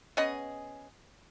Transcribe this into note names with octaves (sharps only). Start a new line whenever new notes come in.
B3 C#4 G#4 D#5